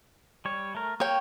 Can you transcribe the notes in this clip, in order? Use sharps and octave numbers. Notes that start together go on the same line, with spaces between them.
G3 C#5
A3 A#4
A#3 C#5 G5